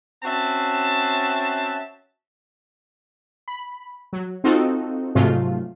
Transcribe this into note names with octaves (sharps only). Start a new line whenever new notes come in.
C4 C#4 F#4 E5 A5
B5
F#3
C4 D#4 F4 F#4 A4
G#2 C3 F3 F#3 A3 F4